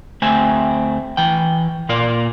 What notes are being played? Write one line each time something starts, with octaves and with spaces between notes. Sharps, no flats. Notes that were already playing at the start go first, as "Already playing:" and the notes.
D2 A3 C4 G4 E5 G#5
E3 G5
A#2 A#3 F4 A#4 D5